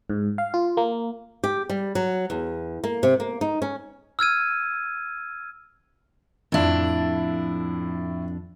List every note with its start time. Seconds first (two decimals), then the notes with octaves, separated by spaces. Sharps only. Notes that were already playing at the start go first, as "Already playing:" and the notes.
0.10 G#2
0.38 F5
0.54 F4
0.77 A#3
1.44 G4
1.70 G3
1.95 F#3
2.30 E2
2.84 A#3
3.03 C3
3.20 A#3
3.41 D#4
3.62 C#4
4.19 E6 F6 G#6 D#7
6.52 F2 A2 D4 E4